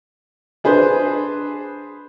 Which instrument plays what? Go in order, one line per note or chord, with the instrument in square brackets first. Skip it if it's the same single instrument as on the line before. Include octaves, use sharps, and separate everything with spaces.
[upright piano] D4 G#4 B4 C5